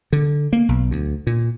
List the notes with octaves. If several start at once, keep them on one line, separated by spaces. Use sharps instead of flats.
D3
A#3
B1
D2
A#2